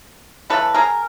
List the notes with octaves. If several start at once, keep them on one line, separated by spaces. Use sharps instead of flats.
C#3 E3 A3 A4 B4
G#4 A#4